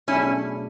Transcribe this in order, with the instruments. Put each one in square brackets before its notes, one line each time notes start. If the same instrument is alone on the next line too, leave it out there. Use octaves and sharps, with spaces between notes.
[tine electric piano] B2 F#3 A3 D4 G#4 [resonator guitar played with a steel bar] C#4 E4